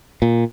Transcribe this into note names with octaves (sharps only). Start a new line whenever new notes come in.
A#2